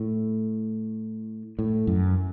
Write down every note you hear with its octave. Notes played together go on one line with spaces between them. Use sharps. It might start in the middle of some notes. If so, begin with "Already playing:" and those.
Already playing: A2
A2
F#2